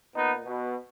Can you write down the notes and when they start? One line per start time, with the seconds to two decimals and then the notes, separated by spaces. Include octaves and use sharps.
0.15 A#2 B3 D#4
0.45 B2